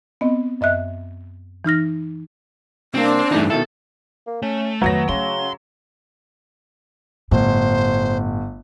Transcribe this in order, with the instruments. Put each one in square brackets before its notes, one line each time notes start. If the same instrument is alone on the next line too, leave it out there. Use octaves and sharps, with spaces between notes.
[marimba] B3 C4 D#5
F#2 D#5 E5 F#6
E3 D#4 F6 A#6
[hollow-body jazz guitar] C2 A#3 [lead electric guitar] C4 [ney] D4
[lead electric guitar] G2 D#4 [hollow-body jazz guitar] E3 A3
[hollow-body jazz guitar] B2 D#3 E4 [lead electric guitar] A4
[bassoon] A#3
[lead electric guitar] A3 [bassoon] C#4
[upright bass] F2 D#3 [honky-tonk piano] F#3 A#6 [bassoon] B3
[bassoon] C#3 [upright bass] A3 C#4 [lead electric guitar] C6
[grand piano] G1 [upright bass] A2 [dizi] C5